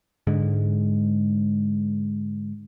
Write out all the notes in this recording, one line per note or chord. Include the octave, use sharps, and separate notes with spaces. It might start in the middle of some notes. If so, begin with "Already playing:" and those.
G#2 D3 G#3